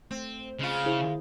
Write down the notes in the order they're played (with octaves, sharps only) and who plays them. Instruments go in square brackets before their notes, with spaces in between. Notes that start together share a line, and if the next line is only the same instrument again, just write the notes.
[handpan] A3 [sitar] C4
[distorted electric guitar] C#3 [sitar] G#3 F4
[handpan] E4 G#4 C5